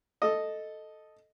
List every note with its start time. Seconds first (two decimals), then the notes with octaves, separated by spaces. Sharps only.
0.22 A4 D#5